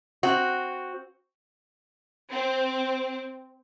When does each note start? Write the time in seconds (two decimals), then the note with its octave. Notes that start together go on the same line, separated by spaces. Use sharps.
0.23 C4 F#4
2.30 C4